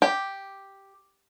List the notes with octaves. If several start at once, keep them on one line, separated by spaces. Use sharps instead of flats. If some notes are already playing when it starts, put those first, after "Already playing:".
G4